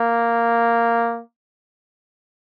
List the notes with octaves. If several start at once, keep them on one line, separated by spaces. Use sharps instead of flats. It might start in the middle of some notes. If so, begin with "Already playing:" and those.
Already playing: A#3